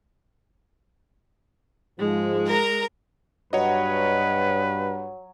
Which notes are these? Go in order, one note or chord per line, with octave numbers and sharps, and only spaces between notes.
G#2 F3 G#3
A#4 A#5
G2 F#3 B4 C#5 D#5